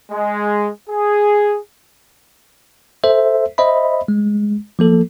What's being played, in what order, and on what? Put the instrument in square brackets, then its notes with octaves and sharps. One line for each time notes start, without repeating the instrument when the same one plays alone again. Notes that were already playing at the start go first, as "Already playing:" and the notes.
[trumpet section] G#3
G#4
[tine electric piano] A4 C5 E5
C5 D#5 E5 B5
G#3
F3 A#3 A4